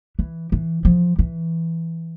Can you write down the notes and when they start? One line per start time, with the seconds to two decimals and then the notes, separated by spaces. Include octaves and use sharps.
0.19 E3
0.52 E3
0.85 F3
1.19 E3